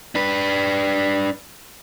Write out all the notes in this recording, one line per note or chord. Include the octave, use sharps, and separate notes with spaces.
D4 B4